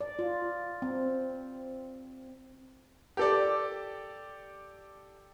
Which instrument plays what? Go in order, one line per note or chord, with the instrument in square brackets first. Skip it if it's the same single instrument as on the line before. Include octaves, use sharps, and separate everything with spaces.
[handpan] D5
F4
C4
[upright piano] G4 A4 D5